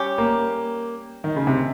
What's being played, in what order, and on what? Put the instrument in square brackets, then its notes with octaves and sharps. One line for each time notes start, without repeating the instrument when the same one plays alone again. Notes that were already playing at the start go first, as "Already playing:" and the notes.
Already playing: [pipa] G3 C#4 G4
[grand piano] A#3
D#3
C#3
C3